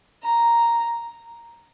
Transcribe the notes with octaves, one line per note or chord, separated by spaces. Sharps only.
A#5